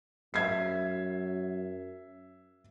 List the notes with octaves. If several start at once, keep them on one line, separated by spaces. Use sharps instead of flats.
F#2 E5 G#6 C7